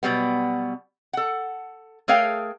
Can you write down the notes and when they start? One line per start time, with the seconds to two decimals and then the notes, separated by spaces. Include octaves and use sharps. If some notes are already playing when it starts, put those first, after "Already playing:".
0.03 B2 F#3 G3 B3
1.13 A4 F#5
2.08 A3 G#4 A#4 C#5 F5 G5